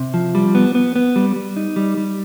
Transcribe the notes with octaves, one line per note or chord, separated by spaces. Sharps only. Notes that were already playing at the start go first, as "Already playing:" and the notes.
Already playing: C3
F3
G3
B3
B3
B3
G3
G3
D#4
G3
G3